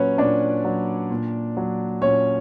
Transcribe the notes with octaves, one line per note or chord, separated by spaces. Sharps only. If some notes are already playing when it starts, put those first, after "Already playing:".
Already playing: A#2 F#3 C#4 B4 C#5
A#2 D4 D5
F#3
A#2
F#3
A#2 C#4 C#5